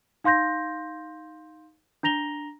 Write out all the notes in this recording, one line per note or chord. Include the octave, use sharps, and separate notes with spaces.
D#4 F5 C6 G6 A#6
D4 A#5 A#6 F7 G7